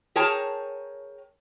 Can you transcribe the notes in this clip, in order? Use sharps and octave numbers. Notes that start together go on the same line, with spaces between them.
G#4 A#4 C#5 G5 A5 A#5